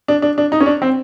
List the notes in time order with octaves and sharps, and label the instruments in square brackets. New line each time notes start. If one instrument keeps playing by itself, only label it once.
[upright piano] D4
D4
D4
D#4
C#4
D4
C4